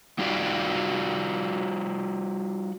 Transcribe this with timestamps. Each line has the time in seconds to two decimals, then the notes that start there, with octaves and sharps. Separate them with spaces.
0.19 G3 D#4 F4 F#4 D5